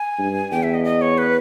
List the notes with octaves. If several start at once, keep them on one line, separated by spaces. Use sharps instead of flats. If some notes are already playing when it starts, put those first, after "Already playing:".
Already playing: G#5
G2
E2 G5
E5
D#5
D#5
C#5
B4